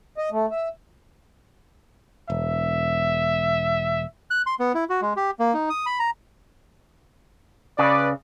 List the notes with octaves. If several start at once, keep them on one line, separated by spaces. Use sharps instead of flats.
D#5
A3
E5
E1 E5
F#6
C6
B3
E4
F#4
G#3
G4
A#3
D#4
D#6
B5
A#5
C#3 B4 D5